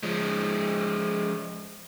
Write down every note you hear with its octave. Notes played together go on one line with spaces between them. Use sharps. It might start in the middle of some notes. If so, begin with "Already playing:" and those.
F3 G#3